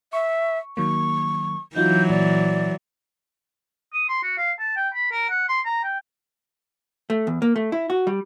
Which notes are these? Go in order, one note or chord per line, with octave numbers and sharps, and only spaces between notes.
E5 C#6
D#3 F#3 A#3 C#6
E3 F#3 D#4 F4 F#4 G6
A#2 D5
D#6
C6
F#4
F5
A5
G5
B5
A#4
F#5
C6
A#5
G5
A3
E2
A#3
A3
E4
F#4
G3